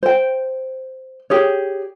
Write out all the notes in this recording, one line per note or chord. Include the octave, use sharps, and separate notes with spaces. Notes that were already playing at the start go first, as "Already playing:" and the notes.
C5 G5
G4 G#4 C#5